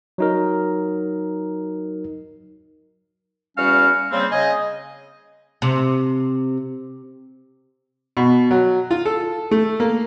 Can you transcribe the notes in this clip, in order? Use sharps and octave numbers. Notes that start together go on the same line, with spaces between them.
F#3 D#4 A#4
E2 G3 C#4 F#4 F5 F6
C#3 G3 A#3 C4
C#3 D#5 G#5
C3
B2
F#3
F4
A4
A3
A#3